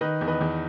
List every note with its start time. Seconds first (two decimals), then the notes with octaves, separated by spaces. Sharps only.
0.01 D#3 B4 D#5
0.21 E2
0.28 B4 D#5
0.41 E2